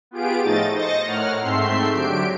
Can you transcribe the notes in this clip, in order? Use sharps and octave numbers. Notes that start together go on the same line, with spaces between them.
B3 F4 G4 G#4 D7
A2 F3 A3 D#4 D#5 A6
C5 D#5 A6 A#6 C#7
A2 A#4 C#5 F#5 F6
G#2 A3 C4 E5 C6 C7
D3 F#3 G4 D7